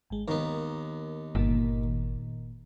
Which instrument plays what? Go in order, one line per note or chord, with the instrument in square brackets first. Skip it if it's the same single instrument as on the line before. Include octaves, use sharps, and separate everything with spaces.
[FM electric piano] G#1 G#3
[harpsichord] D#2 B3 [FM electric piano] A#4
[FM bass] G1 [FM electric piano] A#2 D#3 A#3